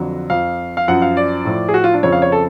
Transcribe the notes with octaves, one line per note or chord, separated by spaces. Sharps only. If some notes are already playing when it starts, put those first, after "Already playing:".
Already playing: F2 D3 F#3
F2 F3 F5
F5
F#2 F3 F#5
F5
D5
A2 F3
G#4
F#4
F4
D4
F2 C#3 F3 C#5
F5
C#5
A4